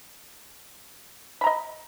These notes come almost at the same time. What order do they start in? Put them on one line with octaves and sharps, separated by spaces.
B5 A#5 D#5